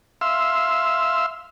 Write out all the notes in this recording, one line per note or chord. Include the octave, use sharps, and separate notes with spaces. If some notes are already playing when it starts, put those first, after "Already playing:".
E5 F5 C6 E6